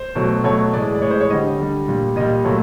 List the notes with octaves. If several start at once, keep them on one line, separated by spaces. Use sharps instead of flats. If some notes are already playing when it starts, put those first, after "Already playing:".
Already playing: C5
B2 F#3 A3
B2 F#3 A3 C#5
A2 E3 G#3 D5
D5
A2 E3 G#3 C#5
C5
C#5
D3 G3 D#5
D3 G3
A#2 G3
A#2 G3 D#5
A#2 F#3 A3